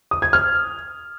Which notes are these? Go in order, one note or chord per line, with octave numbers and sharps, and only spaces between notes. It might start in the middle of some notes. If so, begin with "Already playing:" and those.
D#6
G#6
F6